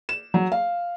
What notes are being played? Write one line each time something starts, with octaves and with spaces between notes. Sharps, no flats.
E7
F#3
F5